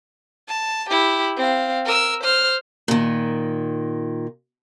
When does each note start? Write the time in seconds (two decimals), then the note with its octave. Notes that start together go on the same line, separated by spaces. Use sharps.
0.48 A5
0.89 E4 G4
1.37 C4 F5
1.85 A#4 E6
2.23 C5 F6
2.88 A#2 D#3